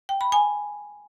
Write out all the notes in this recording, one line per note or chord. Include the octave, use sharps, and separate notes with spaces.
G5
B5
G#5